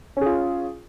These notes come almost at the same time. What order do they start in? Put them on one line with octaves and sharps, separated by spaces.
C#4 G#4 F4